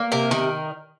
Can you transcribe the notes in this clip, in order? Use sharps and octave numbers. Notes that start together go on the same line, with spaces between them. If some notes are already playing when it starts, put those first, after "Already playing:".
Already playing: A#3
C3 A#4
D#3